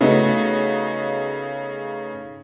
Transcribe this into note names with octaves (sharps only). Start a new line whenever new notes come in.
C#3 A3 B3 D#4 F#4